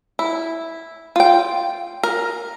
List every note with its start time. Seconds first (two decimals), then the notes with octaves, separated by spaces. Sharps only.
0.19 E4
1.16 F4 G5
2.03 A#4